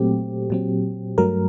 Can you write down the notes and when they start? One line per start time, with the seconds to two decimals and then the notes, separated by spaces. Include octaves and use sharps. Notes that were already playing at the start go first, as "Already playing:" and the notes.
Already playing: A#2 F#3 A3 C4 G4
0.50 A#2 F#3 C4
1.18 G2 F#3 A3 A#4